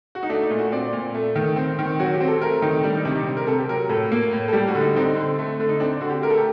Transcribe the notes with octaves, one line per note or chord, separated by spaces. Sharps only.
F#4
D#4
A3 D4
D#4
A#2
F#4
C4 D5
A#2
A3
D#3
C4
D#3
F#3 F#4
G4
C4
A4
A3 A#4
D#3 D#4
G3 D4
D#4
C3 D4
D#4
C4
A#4
C3 A4
G4
F#3 A#4
A2 A4
A#3
A2
A4
G3 G4
F#4
D3
D#4
C4 D#4
D3
A3
D3
D#4
C4 D4
D3 F#4
G4
A3 A#4
A4
G4